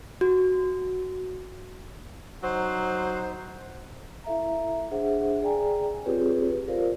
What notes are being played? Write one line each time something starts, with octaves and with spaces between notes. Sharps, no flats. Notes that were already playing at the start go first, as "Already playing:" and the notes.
F#4
F#3 D#4 C5
E4 A4 E5 F5 A#5
D4 G#4 C5 E5 F#5
G#4 D5 G5 G#5 A#5
C4 F4 G4 G#4 B4 C#5
F4 A4 A#4 C5 D5 F5